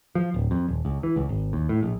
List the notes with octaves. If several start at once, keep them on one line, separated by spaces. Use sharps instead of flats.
F3
D1
F2
D#1
C#2
E3
C#2
G#1
D#2
A2
A#1